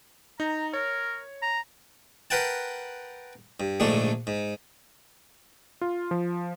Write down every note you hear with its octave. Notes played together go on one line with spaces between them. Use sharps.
D#4 A#5
A#4 C#5
A#5
A#4 B4 F#5 G5 A5
G2
A#1 G#2 D3 A3 D4
G#2
F4
F3